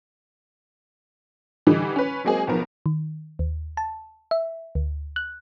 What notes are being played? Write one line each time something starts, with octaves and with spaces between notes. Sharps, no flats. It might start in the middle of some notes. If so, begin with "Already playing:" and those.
D3 E3 G3 D#4
C#4 B4
F#3 G#3 A#3 C4 G#4
B1 F3 B3 A#4
D#3
D#2
A5
E5
D2
F#6